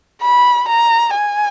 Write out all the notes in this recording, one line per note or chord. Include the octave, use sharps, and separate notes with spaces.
B5
A#5
G#5